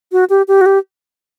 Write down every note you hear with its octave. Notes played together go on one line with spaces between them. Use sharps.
F#4
G4
G4
F#4
G4